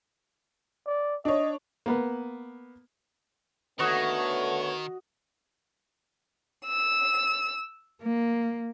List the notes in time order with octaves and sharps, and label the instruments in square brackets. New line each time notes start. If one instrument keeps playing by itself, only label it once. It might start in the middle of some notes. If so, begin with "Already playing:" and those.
[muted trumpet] D5
[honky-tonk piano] D4 C#5 [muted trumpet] D#5
[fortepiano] A#3 B3 B4
[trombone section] D3 A3 B3 [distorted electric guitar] D#3 [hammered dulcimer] F#4 D#5 [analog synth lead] C#5
[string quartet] E6
A#3